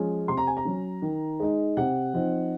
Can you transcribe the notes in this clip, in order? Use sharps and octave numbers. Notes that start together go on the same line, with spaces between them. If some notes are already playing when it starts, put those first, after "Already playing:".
Already playing: F3 G#3 C#4
C3 C6
A#5
G#5
A#5
F#3 C#4
D#3
G#3 D#4
C3 F#5
F3 C4 D#4